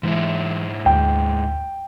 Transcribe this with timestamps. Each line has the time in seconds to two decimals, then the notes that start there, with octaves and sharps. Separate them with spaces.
0.03 G#2 E3 G#3 E4
0.86 D2 G5